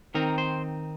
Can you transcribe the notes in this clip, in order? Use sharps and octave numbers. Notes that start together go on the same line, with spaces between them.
D#3 C4 D#4 A#4
C5